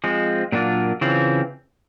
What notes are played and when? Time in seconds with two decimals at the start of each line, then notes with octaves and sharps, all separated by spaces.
0.04 F3 G#3 C4
0.52 A#2 F#3 A#3 D4 F4
1.01 C#3 E3 C4 F4